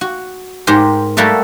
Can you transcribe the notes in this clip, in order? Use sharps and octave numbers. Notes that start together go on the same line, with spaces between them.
F#4
G#2 G4 A#4 C5
G3 A3 A#3 F#4 A4 E5